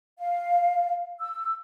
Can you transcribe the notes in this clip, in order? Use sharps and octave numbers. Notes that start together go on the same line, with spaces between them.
F5
E6